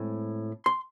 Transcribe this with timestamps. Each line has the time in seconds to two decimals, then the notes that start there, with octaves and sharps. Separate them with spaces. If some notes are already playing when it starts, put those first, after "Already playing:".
Already playing: A2 G#3 C4
0.66 C6